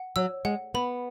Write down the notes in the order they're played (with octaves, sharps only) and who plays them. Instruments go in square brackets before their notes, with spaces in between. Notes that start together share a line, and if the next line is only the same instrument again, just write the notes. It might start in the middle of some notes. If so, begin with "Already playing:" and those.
Already playing: [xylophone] F#5
[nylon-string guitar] F#3 [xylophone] E6
[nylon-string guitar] G#3 [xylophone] F#5
[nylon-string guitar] B3 [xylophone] B5